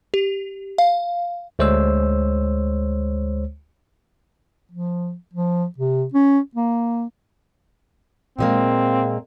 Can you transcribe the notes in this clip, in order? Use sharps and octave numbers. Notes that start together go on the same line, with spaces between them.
G4
F5
D2 G#3 C5 C#5 E6
F3
F3
C3
C#4
A#3
A#2 G#3 A#3 C4